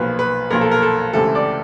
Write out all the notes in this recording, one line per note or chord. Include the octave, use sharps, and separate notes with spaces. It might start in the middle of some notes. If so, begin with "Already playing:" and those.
Already playing: B1 A#2 F3 A#3 B4
B4
B1 A#2 F3 A#3 A#4
A4
A#4
A4
C#2 C3 E3 A3 A4
D5